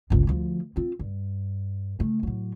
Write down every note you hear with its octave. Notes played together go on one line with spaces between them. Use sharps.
G1 C#2
D2 F3
C4 F4
G2
C#3 A3
A2 F#3